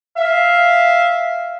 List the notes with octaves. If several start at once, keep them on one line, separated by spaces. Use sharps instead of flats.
E5 F5